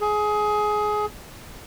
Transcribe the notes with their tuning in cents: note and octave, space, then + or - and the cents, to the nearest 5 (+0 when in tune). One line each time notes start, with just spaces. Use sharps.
G#4 +20